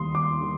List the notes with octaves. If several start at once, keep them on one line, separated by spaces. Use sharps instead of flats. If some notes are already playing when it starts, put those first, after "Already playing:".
Already playing: D#2 D#3 G3 C6 D#6
D6
D#3 G3